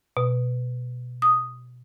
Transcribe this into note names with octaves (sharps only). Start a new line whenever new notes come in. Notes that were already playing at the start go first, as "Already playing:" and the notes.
B2
D#6